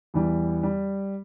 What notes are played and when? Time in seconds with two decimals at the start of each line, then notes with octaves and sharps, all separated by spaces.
0.14 E2 E3 G3
0.63 G3